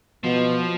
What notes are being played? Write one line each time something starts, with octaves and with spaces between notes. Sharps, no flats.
B2 F3